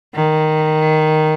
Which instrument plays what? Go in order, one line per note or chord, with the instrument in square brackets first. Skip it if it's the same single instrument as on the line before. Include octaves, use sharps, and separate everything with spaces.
[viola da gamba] D#3